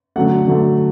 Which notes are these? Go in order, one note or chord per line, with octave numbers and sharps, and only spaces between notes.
D3 F#3 A3 F#5
D3 F#3 A3